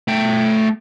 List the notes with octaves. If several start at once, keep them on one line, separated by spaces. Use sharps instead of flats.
A3 G5